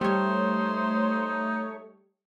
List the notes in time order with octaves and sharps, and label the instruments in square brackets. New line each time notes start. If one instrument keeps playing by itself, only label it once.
[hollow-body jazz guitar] G3 [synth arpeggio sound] A3 C#5 [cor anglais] D#4 [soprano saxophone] C5